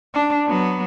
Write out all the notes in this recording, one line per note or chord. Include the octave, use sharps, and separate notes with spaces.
D4
F#3 B3